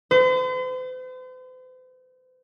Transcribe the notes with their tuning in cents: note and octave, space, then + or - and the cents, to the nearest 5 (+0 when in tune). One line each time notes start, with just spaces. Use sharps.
C5 -45